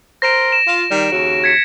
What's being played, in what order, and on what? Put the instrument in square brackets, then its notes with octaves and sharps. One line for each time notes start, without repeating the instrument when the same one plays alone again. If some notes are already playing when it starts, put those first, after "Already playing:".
[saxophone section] A#4 C5 [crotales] A#6 D7
[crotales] E7
[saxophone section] F4
D#3 G3
D#2 C#3 F#4
[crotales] G#6 B6 C#7